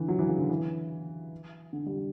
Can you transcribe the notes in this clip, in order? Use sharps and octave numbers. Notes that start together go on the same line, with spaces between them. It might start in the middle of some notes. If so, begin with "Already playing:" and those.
Already playing: D3 E3
F#3
E3
C#3
D3
E3
D3
G3